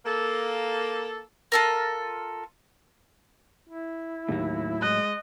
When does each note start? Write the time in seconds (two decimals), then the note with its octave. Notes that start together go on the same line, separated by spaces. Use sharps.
0.05 A#3 A4
1.52 F4 A4 A#4
3.69 E4
4.28 D#2 A2 F#3
4.82 G#3 D#5 F#6